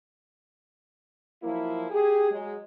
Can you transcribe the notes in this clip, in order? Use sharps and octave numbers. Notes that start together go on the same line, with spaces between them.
F3 F#3 A#3 E4
G4 G#4
F#3 G#3